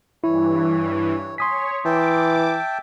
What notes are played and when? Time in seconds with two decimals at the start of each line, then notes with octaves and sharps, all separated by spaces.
0.24 G2 E3 E4 C#5
1.38 C#5 G#5 C6 D#6 B6
1.85 E3 E5 G5 A5 D6